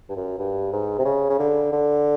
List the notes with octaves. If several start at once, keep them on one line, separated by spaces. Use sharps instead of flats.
G2
F#2
G2
G#2
C3
C#3
C#3
D3
D3